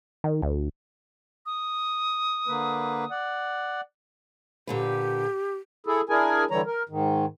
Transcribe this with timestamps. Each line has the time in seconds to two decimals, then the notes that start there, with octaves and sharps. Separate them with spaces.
0.24 D#3
0.42 D2
1.46 D#6
2.48 D3 A#3 B4
3.11 D5 F#5
4.67 A#2 D3 G4 B4
5.87 E4 G#4 A4
6.09 D4 E4 G#4 A#4 G#5
6.51 D3 E3 G3 C#5 A#5
6.66 A#4
6.89 G#2 D#3